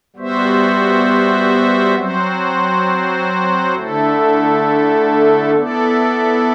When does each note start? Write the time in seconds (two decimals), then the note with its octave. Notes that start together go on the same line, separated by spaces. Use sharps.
0.16 G3 B3 F#4 C5 E5
1.95 F#3 C4 F#4 C5
3.74 D3 A3 E4 A4
5.53 B3 E4 A4 D5